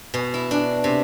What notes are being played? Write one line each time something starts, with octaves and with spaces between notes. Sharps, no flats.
B2
E4
D4
C3